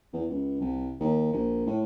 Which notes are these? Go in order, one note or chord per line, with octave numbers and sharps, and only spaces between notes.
E2
C#2
C2
D#2
A#1
A2